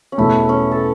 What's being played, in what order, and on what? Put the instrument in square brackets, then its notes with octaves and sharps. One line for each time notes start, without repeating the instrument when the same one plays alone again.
[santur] C#4
[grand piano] E2 B2 A3 [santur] E4
[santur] C#4
A4